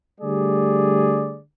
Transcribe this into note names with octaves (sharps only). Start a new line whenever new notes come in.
D3 G3 A3 G#4 D5